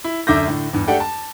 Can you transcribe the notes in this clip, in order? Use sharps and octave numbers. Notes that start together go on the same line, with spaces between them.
E4
F#2 D3 E5 D6 G6 A#6
A2 D3
E2 G2
A3 D4 G4 A4 F#5 G5
A5